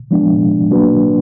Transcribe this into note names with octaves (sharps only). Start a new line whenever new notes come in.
F3 G#3 B3 D4
F#3 A#3 D4 F#4 B4